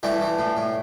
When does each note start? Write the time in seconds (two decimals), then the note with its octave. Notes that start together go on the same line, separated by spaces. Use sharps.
0.03 E3 G3 A3
0.21 E3
0.39 A2
0.57 A2